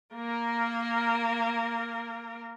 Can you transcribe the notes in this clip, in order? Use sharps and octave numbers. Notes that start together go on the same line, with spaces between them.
A#3 A#4